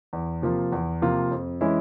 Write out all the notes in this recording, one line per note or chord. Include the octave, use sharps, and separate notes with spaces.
E2
C3 F3 A#3 F4
E2
C3 F3 A#3 F4
F2
E3 G#3 C#4 E4